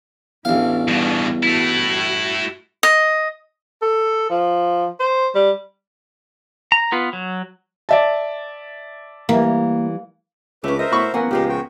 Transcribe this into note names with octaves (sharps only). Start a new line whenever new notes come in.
A1 E2 E3 D4 F5
G2 B2 G3
G2 A3 E4 F#4
D#5
A4
F3
C5
G3
A#5
B3 F4 B4
F#3
D5 E5 A5
E3 G3 A#3
C#2 A3 C#4 B4 D6
A#4 C5 D#5 E5
A2 F#4 B5 C#6
A1 F#3 A#3 B3 F#5 G#5
C#2 A#2 F3 G#3 G4
F#4 G5